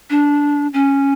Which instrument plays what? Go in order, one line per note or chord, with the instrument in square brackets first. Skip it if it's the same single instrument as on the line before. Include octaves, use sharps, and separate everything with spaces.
[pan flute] D4
C#4